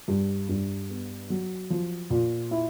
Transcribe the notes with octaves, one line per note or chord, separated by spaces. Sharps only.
G2
G2
B3
F#3
F3
A#2
E4